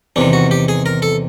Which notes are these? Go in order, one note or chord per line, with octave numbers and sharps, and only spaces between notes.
E2 C3 D#3 D4
F#4
G4
G#4
A#4
A4